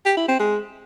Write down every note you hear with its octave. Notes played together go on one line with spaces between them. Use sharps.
G4
E4
C4
G#3